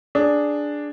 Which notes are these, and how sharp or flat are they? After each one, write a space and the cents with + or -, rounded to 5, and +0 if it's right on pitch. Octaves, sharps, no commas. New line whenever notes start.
D4 +0 G#4 +0